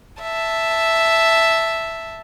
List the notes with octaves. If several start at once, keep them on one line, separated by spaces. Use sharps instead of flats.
E5 A5